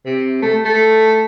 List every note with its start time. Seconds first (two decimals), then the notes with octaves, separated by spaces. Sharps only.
0.06 C3
0.42 A3
0.64 A3